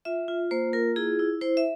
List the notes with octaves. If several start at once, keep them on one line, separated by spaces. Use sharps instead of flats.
F4 E5
F4
A#3 C5
F4 A#4
E4 G#4
E4
E4 C5
E5